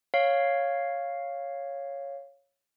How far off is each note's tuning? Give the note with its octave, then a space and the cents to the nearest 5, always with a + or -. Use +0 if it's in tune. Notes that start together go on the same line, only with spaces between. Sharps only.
C#5 +0 F5 +0